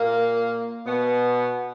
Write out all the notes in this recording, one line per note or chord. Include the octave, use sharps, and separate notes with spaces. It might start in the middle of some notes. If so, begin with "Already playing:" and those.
Already playing: A#2 A#3
B2 B3